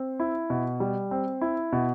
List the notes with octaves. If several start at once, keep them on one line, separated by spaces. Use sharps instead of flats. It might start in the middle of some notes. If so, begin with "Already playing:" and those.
Already playing: C4
E4
B2
G3
C4
E4
B2